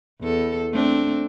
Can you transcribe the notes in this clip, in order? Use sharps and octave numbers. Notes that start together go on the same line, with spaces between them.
E2 A4
A3 C4 D4